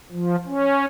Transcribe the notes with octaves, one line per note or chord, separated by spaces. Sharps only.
F3
C#4